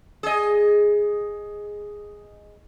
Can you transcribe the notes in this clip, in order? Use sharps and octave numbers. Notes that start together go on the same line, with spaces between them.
G#4 D#5